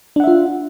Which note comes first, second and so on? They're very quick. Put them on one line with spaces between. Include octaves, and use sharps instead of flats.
D4 F#5 E5 F4